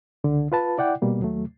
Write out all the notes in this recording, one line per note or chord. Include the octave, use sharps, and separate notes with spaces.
C#2 D3
F4 B4 A5
E4 D5 F#5 G5
B2 G3 A#3
D#2 F#3 A3